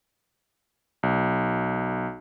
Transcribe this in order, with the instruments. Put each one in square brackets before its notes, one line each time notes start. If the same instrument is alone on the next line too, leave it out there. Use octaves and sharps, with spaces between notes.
[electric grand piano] B1